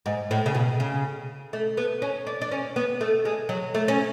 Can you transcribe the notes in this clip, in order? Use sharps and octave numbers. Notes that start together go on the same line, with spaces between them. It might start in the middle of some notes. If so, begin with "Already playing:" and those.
G#2
A2
C#3
B2
C#3
A3
B3
C#4
D4
D4
C#4
B3
A3
G#3
F#3
A3
C#4